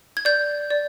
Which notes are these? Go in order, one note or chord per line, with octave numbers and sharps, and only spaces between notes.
G#6
D5 G6
D5